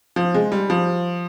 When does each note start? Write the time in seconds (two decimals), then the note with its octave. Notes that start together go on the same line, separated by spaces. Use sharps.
0.16 F3
0.34 G#3
0.52 G3
0.70 F3